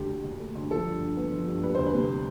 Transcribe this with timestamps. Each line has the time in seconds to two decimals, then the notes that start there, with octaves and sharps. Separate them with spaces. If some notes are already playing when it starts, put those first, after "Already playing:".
Already playing: D2 A3 G4
0.09 D3
0.24 D2
0.40 A3
0.55 D2
0.71 F3 A4
0.86 G2
1.01 D3
1.17 B3
1.32 F3
1.47 G2
1.63 G3 B4
1.75 D2 C5
1.86 B4
1.94 C3
2.09 B3